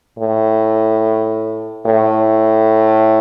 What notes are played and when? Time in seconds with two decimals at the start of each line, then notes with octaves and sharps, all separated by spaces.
0.19 A2
1.86 A2